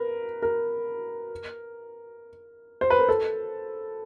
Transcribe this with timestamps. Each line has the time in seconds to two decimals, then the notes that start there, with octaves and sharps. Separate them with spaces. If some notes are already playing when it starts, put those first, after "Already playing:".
Already playing: A#4 B4
0.42 A#4
2.81 C5
2.90 B4
2.99 A#4
3.09 A4